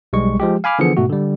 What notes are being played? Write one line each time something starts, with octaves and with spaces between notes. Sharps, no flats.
B1 G3 G#3 C#6
F3 G#3 G4
F5 G#5 B5 D6 F6
D3 E3 F3 B3 G#4 C#7
G#2 B2 A3 F#4
D3 G3